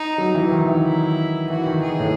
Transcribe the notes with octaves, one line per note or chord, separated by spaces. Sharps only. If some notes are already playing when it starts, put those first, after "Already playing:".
Already playing: D#4
F#3
E3
D#3
E3
E4
E3 F#4
D#3
G#4
A2